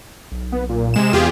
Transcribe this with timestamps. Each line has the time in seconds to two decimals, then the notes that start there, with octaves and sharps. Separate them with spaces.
0.32 B1
0.52 B3
0.69 A#2
0.94 C3 G#3 E7
1.13 E2 F4 G4 G#4